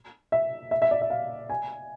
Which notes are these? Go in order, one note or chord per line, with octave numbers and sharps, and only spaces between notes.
E5
E5
E5
D5
E5
F5
G#5